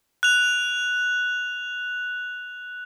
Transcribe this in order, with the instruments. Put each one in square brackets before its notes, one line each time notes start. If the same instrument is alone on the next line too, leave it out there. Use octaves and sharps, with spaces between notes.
[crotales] F#6 F7